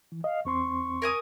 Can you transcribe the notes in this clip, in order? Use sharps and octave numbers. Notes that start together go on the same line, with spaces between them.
E3
D#5 F5
E2 C4 C6 C#6
A#4 G#5 D#6